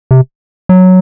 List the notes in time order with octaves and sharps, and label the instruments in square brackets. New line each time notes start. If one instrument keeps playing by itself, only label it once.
[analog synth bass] C3
F#3